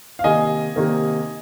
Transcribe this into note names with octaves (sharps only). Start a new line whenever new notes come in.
F5
C3 D#3 A#3 D#5 G#5
C3 D#3 A#3